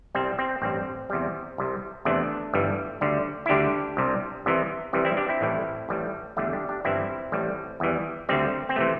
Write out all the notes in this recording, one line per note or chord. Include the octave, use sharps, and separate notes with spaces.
C2 C3 G3 C4
C4
A1 G2 G3 C4
E2 C3 G3
C2 C3 G3
E2 C3 E3 A3 D4
G1 G2 E3 G3
D2 D3 G3
E4
D2 D3 G3 D4 G4
C2 C3 G3
C2 C3 E3
C2 C3 E3 G3
C4 E4
D4 G4
C4 E4
A1 A2 E3 G3
A1 A2 E3 G3
E2 D3 G3 A3 D4
D4 G4
D4 G4
G1 G2 E3 G3 C4 E4
A1 A2 G3
E2 E3 G3
D2 D3 G3 C4
C4
C3 E3 A3